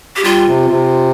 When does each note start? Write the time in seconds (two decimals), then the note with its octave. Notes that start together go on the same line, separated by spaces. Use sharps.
0.16 G4
0.24 G3 F4
0.47 C3
0.70 C3